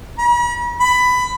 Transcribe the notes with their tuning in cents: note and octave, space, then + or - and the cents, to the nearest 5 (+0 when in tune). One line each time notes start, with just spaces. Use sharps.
B5 -45
B5 +15